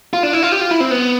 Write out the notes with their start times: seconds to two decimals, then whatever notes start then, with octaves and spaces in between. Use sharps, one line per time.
0.13 F4
0.23 D4
0.33 E4
0.43 F4
0.52 G4
0.61 F4
0.71 E4
0.80 C4
0.91 B3